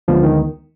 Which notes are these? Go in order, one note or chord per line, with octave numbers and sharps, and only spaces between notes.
D2 D3 F3 G#3 B3
D#3